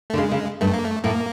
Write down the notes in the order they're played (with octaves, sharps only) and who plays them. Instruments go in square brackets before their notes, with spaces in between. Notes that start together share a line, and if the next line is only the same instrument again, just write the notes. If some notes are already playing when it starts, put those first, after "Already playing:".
[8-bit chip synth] A3
[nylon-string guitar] D3
[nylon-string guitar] C#3 [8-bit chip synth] G#3
[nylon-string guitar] C#3
[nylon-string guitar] G2 [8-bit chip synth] A3
[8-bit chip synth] A#3
A3
[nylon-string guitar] A2 [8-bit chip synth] A#3